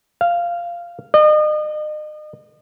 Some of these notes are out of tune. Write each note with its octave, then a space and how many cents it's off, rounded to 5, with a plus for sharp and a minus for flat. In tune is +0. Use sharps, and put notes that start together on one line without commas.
F5 -10
D#5 -35